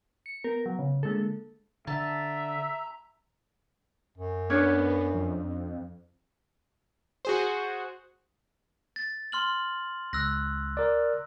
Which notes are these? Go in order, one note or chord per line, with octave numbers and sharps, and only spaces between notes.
C#7
B3 A#4
F#3
C#3
D3 G#3 A#3 A4
D3 E5 A5 A#5
F#2
B3 C#4 D4 C#5
F2
F#4 G#4 C5
A6
C6 F6 F#7
C#2 E6 F#6 A#6
A#4 D5